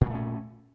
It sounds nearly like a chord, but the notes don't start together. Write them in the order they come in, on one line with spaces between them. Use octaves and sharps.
A#2 G3 A3 C#4